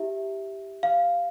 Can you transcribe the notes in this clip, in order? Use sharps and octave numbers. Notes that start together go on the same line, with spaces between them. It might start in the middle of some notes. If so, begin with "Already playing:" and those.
Already playing: E4 G4 E5
F5